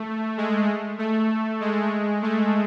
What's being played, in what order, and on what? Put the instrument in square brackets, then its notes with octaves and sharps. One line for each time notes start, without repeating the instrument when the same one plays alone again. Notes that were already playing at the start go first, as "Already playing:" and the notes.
Already playing: [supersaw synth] A3
G#3
A3
G#3
A3